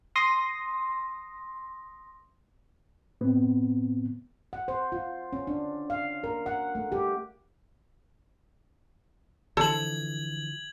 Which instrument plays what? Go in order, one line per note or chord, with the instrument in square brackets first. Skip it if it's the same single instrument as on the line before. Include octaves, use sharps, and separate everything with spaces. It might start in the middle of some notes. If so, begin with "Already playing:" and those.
[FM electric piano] C6 D#6 A#6
[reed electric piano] A2 B3 C4
[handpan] F#5
C5
F4
C#4
D4
F5
A#4
F#5
A3
G4
[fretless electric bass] D3 E3 F3 [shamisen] A4 C5 A5 [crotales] G#6 F#7